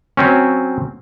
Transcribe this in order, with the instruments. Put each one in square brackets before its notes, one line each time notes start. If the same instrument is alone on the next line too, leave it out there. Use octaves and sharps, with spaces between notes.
[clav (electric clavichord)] F#3 C4 C#4